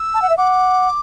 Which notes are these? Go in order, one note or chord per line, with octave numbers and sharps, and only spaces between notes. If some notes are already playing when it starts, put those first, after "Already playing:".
Already playing: E6
A5
F#5
E5
F#5 D6